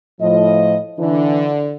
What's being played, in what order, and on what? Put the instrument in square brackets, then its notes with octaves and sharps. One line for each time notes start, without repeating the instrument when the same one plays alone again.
[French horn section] A2 F3 [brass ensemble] D#5
[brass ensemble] D3 [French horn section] E3 D4